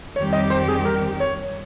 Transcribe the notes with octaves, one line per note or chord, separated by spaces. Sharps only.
F2 D#3 G3 C4 G4 C#5
D#5
C5
G#4
A#4
C#5